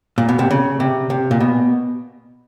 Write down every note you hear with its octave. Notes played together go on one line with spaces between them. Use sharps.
A#2
B2
C3
C#3
C3
C3
A#2
B2